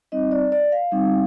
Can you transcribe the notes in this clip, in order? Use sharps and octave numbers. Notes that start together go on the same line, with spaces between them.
G3 C4 D#4 D#5
D5
D5
F5
G3 C4 D#4